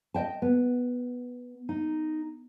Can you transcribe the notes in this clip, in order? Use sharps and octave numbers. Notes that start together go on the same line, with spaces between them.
D#5 E5 G5 A5
B3
D#4